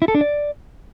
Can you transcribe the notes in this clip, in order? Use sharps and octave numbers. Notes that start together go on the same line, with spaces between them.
E4
A4
D4
D5